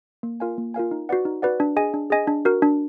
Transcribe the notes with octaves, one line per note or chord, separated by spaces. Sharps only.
A#3
F4 A#4 F5 G#5
A#3
F4 A#4 F5 G#5
D#4
F#4 B4 D5 F#5
D#4
F#4 B4 D5 F#5
D4
G#4 D#5 G#5
D4
G#4 D#5 G#5
D4
F#4 A#4
D4